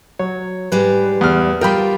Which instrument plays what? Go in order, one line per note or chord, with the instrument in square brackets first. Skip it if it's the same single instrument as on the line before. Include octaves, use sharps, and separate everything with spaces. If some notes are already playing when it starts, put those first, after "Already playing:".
[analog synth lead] F#3 [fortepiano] C#5
[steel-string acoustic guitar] G#2 G3 G#3 [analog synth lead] B4
[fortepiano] E2 F6
[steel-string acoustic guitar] G3 F4 [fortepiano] A#4 G5 B5